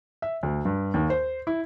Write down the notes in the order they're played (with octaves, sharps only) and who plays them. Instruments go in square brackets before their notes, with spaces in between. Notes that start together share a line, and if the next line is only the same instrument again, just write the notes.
[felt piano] E5
D2
G2
D#2
C5
E4